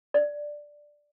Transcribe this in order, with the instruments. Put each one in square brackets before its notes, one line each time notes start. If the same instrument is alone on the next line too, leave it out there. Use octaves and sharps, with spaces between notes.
[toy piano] D5